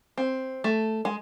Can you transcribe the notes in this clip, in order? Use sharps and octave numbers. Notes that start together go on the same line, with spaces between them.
C4
A3
G#3